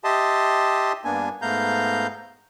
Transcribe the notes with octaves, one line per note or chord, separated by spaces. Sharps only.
G4 D#5 E5 A5 C6 D#6
G2 A#3 B3 D4 G#5
G#2 A3 B3 F5 A#5 G6